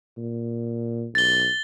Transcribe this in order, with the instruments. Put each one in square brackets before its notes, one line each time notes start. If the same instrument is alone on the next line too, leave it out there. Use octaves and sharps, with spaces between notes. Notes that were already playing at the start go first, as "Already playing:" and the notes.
[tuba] A#2
[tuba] B1 [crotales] A6 G7